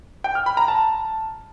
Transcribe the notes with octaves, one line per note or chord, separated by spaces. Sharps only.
G5
F6
B5
A#5
A5